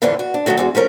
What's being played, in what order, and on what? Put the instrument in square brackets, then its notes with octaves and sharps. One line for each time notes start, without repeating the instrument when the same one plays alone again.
[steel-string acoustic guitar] F2 A2 D3 E3 D4 F4
F#4
D4
D#3 E3 F#3 A3 F#4
E2 G#3 F#4
F3 A3 C#4 A#4